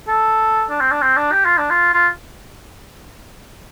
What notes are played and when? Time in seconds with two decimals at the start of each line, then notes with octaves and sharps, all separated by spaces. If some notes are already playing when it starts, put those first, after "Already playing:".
0.08 A4
0.70 D4
0.80 C4
0.91 D4
1.02 C4
1.17 D4
1.32 G4
1.45 F4
1.58 D4
1.70 F4
1.94 F4